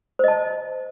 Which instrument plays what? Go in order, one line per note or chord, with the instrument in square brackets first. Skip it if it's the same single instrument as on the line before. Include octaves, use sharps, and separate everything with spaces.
[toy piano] C5
D#5
A5